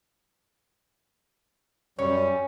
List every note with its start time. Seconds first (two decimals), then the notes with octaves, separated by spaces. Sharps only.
1.99 F#2 G3 C#4